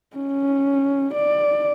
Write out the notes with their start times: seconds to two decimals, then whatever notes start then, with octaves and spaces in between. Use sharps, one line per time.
0.17 C#4
1.14 D5